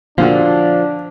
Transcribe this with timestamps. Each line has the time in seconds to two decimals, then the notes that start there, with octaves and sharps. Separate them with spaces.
0.18 A#2 D3 F3 D4 F#4 F5